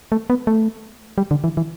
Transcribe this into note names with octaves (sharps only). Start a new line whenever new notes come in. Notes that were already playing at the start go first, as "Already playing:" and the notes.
A3
B3
A3
G3
D3
E3
E3